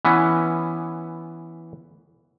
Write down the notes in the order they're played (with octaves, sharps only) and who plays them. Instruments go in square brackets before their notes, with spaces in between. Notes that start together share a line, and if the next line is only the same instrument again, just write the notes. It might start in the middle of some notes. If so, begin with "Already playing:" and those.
[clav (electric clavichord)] E3 B3 C#4